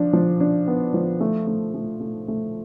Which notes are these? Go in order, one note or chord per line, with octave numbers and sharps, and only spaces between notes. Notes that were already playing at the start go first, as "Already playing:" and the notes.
Already playing: F3 D4
F3
D4
B3
F3
A3
A3
A3
A3
A3